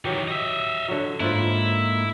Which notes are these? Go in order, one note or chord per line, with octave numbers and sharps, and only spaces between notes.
D#3 E3 F#3 G4
D#5 E5
D3 F#3
G#2 A#3 E4 F4 C5 F#5